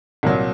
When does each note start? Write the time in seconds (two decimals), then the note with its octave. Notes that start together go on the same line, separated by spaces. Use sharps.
0.23 C2 A#2 F#3